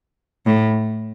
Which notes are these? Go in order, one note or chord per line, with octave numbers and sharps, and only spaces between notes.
A2